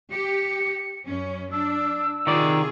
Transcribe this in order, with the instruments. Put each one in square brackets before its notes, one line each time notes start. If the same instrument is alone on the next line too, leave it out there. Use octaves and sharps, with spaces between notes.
[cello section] G4 [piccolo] C#7
[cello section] F#2 C#4
[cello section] D4 [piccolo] E6
[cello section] C3 F4 G#4 [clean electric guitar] D#3 D5